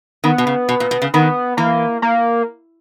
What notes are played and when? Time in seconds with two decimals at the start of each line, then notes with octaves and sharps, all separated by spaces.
0.24 D#3 B3
0.38 B2
0.47 C#3
0.69 B2
0.80 A#2
0.91 B2
1.02 C#3
1.14 D#3 B3
1.57 E3 A#3
2.02 A#3